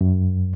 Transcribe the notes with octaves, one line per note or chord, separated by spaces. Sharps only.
F#2